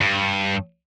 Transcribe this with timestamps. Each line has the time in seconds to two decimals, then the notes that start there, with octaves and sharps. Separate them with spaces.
0.01 G2